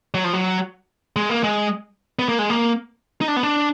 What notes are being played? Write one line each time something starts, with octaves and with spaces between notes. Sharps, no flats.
F#3
F3
F#3
G#3
A#3
G#3
B3
A#3
G#3
A#3
D#4
D4
B3
D4